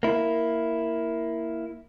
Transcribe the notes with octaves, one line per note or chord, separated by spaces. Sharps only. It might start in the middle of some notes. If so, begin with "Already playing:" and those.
A#3 E4